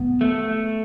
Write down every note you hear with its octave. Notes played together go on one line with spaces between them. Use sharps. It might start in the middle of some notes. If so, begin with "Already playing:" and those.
Already playing: B3
A3